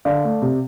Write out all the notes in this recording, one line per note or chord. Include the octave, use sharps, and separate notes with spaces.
D3 D5 F5
A3
C3